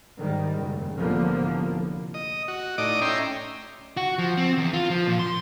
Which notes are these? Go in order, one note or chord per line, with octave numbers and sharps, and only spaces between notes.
G#2 D#3 G3
F#1
C2 A2 D3 F3 A#3 B3
D#5
F#4
A2 D#4 D5 D#5 D6
C#4 E5 G5 A#5 C6
F#4
F3
C4
E2
F4
F3
A#2
C6